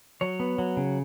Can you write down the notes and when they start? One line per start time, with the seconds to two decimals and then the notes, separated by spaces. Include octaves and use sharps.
0.21 F#3 C#5
0.40 B3
0.59 F#3
0.77 C#3